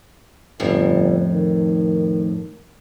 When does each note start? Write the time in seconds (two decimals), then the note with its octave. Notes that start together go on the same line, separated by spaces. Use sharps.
0.60 G1 F2 A2
1.33 D#3